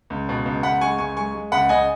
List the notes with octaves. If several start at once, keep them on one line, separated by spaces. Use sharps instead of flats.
C#2
B2
C#2
C#2 F#5 B5
G#3 G#5 C#6
C#2 G#5 C#6
G#3 G#5 C#6
G#3
C#2 F#5 B5
C#2 D#5 G#5